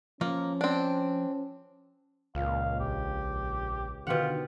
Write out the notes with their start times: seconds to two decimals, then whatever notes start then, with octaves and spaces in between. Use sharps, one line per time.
0.21 F3 A#3 C#4
0.61 C4 D4
2.35 C#2 A#2 F5
2.79 A#1 G4
4.07 B2 D3 D#3 F4 G4 F#5